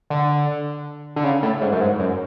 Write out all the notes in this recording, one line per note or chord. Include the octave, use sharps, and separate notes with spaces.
D3
D3
C#3
A2
G#2
F#2
G#2
F#2